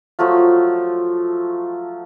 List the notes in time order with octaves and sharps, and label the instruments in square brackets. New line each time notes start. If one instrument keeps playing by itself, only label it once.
[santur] F3 F#3 A3 F4